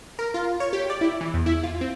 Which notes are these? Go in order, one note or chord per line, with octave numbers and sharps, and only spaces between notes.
A#4
F4
C#5
G4
D5
E4
E3
E2
E4
F4
C4